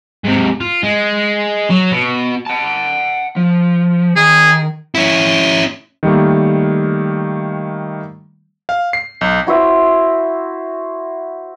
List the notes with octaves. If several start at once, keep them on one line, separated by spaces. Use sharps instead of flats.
G#2 C3
F4
G#3
F#3
B2
F#5 A5
F3
D#3 G#4
C#4 E4
D#3 G3 A3 A#3
F5
C7
B1
E4 F#4 C5 E5